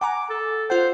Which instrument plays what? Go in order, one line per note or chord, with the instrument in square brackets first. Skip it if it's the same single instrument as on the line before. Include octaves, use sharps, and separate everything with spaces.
[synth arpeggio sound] F#5 G#5 A#5 [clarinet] D6
[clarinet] A4
[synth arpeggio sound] F4 F#5 [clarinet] C5